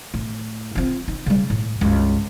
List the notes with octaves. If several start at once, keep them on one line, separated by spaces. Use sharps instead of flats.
A2
C4 F4
D#4
C#3 G3
A2
C#2 G2